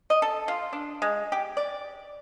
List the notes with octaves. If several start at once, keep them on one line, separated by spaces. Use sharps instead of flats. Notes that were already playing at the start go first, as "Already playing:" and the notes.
D#5
A4
F4
D4
G#3
G4
D5